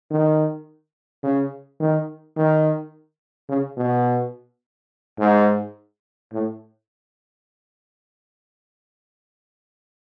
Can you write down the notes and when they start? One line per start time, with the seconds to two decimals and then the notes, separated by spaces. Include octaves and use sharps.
0.11 D#3
1.23 C#3
1.80 D#3
2.36 D#3
3.49 C#3
3.77 B2
5.19 G#2
6.32 A2